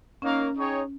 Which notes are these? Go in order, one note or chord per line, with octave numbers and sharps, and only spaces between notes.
A#3 C#4 D#4 A#4 C#5 F5
D#4 G#4 C#5 G5